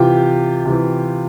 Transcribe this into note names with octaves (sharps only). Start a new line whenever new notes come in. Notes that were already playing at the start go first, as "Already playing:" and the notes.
Already playing: C3 E3 F4 G4
C3 E3